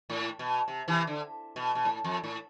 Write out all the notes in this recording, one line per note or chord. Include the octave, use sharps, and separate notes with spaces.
A2
B2
C3
C3 E3
D3
B2
B2
A2
F2
A2